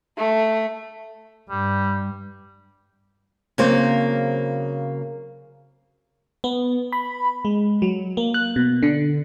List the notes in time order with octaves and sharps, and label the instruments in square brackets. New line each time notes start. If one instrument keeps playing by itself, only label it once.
[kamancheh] A3
[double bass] G2 [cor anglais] G3
[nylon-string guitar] C#3 F#3 A#3 C4 C5
[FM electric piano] B3
B5
G#3
F#3
A#3
F#6
B2
D3